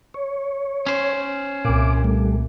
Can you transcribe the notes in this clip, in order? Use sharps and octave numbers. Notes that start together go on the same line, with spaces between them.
C#5
C#4 C5
C2 A#2 D6
G3 A3